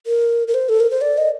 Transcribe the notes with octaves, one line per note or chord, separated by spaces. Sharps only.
A#4
A#4
C5
A4
A#4
C5
D5
D#5